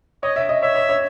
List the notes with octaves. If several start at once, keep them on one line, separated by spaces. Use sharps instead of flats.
C#5 D#5
E5
D#5
C#5 E5
C#5
C#5